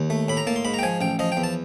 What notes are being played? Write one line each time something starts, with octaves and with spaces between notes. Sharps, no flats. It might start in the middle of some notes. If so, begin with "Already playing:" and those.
Already playing: D#2
A3
A2 B5
A#5
A#3 A5
C6
G#2 B5
A#5
G5
F3 G#5
A1 G5
F3 D#5
G5
E2
A5